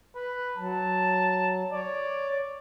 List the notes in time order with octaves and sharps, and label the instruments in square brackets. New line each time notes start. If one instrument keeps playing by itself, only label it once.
[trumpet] B4
[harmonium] F#3 [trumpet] A5
[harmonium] C#5 [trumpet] D5